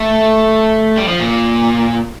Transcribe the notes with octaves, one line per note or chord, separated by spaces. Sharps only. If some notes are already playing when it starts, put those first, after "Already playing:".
Already playing: A3
G3
F3
A#2